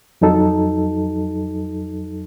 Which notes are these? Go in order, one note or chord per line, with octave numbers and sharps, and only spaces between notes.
F2 F#3 D#4 A4